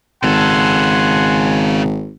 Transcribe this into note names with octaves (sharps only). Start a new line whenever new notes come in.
G#1 C#3 A4 F#5 G#5 C6